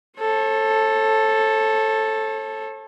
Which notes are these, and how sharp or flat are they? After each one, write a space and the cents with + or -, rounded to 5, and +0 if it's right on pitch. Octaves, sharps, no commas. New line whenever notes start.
A4 +0 C#5 -40